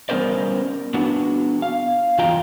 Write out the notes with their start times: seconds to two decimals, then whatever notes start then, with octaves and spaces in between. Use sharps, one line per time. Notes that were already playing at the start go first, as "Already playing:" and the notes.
0.09 G3 B3 C#4 A#4 C5 D5
0.94 B3 D4 F#4
1.62 F5
2.18 E2 F#3 F4 F5 G5 A#5